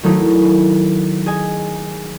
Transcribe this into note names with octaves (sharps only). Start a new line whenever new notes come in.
D#3 F#3 A3 D#4 E4
G#4 D#5 G#5